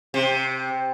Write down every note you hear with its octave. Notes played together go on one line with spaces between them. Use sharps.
C3